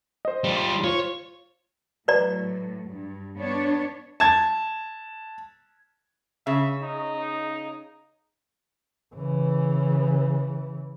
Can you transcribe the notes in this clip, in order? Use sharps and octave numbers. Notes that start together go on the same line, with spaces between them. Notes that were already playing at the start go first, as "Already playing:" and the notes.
C5 D#5
G3 F4
C6
F4 C5 C#5
A2 F#3 B4 D5 A#5
G2
B3 D4 C#5
A5 G#6
C#3 E5
D#4
C#3 E3